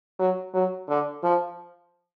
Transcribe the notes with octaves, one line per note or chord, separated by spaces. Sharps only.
F#3
F#3
D3
F3